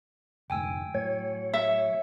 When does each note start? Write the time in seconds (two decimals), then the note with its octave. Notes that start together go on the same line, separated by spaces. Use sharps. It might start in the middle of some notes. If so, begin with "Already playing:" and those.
0.50 F1 D2 G#2 G5 G#5 E6
0.95 A2 F#3 C#5
1.53 E5 E6